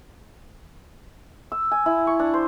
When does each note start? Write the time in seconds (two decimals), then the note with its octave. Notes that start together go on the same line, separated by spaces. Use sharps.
1.52 E6
1.71 G#5
1.86 E4
2.07 C#6
2.19 D4
2.34 C5